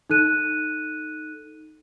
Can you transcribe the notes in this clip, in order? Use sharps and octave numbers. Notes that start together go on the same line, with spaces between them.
D#4 A4 F#6 D#7